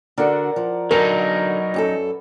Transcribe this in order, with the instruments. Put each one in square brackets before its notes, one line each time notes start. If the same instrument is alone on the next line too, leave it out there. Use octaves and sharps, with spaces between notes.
[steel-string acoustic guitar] D3 F#4 [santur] A#4 D5 F#5
[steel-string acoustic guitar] F3
[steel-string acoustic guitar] D3 A5 [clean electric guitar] F#3 D#4 [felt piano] A#4 [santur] B4 G#5
[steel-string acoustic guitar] F#2 G4 A4